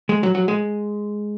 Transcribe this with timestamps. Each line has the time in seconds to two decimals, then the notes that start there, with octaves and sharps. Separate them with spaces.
0.09 G#3
0.23 F#3
0.35 F#3
0.48 G#3